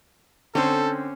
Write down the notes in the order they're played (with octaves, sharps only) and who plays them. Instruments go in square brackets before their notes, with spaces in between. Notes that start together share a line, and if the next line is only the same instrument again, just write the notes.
[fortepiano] D3 C4 [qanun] C#4 C5 [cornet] A4